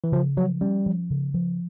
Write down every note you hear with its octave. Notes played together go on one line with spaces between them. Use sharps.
E3
C#3 F3
F3 F#3
G3 C#4
F3
C#3
F3